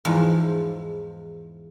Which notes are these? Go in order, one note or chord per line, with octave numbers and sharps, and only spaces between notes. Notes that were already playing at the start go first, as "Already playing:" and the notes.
E2 G#2 F3